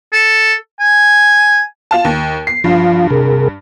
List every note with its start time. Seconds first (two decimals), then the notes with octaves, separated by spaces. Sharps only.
0.13 A4
0.80 G#5
1.91 F4 F5 A5
2.05 D#2
2.47 C7
2.64 G2 F3 F4 F5
3.10 C3 G#4 A#4